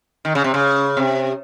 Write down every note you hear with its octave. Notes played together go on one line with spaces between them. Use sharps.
D#3
C#3
C3
C#3
C3